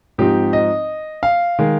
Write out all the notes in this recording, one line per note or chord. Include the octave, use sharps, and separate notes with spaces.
G#2 F3 C4 D#4 G4
D#5
F5
D#3 G#3